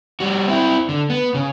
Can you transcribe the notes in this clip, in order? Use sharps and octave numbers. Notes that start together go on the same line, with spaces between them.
G3 F#4
C4 E4
D3
B3
C#3